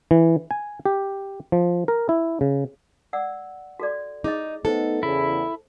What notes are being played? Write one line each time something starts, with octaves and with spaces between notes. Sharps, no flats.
E3
G#5
G4
F3
A#4
E4
C#3
D5 F#5 E6
F#4 A4 D5
D#4 G#4 D#5
A3 B3 D#4 A4 C5
E2 C#3 E4